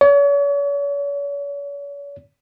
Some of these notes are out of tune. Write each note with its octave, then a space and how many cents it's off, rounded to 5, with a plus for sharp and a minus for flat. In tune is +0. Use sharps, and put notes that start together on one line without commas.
C#5 +40